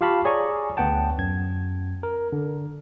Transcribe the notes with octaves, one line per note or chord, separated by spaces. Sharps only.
F4 G4 F5 A5 B5 C#6
G#4 C#5 D5 G#5 A#5 C#6
D2 B3 F#5 G5 A5
F#2 G#6
A#4
D3